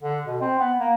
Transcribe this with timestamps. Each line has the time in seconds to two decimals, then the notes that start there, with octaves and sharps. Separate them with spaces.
0.03 D3
0.27 B2
0.41 C4
0.60 B3
0.80 A#3